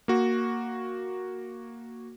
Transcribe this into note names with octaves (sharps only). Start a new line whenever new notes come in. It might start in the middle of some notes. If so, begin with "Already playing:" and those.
A#3 F#4